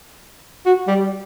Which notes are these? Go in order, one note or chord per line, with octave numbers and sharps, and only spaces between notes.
F#4
G3